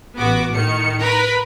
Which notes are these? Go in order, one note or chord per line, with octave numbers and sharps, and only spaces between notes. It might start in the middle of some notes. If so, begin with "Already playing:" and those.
A1 B3 F#4 D6
A2 D#3 C#7
A#4 B4 B5